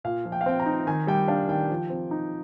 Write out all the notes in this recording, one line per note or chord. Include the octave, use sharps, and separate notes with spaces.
A#2 F5
F3
G5
F5
C4 G5
A#5
D#4
D#3 G#5
G3 G5
D4 F5
D#3 G5
F3
C4
D#4